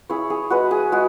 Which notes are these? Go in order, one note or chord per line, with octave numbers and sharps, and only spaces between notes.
E4 G#4 C#5
G#4 C#5
G#3 F#4 B4
G#4
G#3 F#4